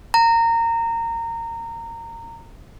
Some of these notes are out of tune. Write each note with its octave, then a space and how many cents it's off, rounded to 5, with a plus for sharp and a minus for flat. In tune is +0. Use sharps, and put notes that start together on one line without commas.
A#5 -20